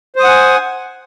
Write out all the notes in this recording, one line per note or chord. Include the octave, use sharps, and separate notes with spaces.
C5 F#5 G#5 D#6